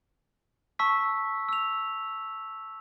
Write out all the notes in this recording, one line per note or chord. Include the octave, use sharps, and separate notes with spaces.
A5 C#6 E6 B6
E6 F7